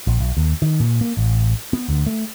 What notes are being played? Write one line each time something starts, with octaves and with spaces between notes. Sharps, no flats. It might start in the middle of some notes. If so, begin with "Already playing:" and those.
A#1
B1
D#2
D#3
A#2
A#3
A1
B3
D2
A3